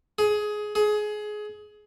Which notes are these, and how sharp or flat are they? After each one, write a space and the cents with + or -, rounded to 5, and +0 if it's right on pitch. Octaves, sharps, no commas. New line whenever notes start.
G#4 +15
G#4 +20